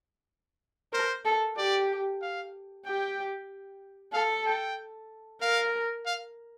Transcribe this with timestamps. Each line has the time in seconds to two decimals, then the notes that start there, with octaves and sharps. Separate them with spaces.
0.93 A#4 C5
1.25 A4
1.57 G4 D5
2.22 F5
2.86 G4 G5
4.13 A4 F5
4.46 G5
5.42 A#4 F5
6.06 F5